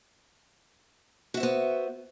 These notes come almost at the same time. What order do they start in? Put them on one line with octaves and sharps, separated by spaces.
F#4 E5 C5 B3